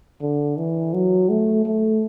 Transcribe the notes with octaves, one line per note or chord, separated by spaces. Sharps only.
D3
E3
F#3
A3
A3